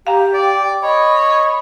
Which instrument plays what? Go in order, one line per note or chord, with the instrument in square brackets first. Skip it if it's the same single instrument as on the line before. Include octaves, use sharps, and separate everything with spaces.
[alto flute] G4 [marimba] F5 A#5 [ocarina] G5
[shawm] D5
[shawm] C#5 [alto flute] D#5 [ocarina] B5